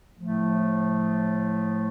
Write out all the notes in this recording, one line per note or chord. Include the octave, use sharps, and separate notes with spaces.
A2 F3 A3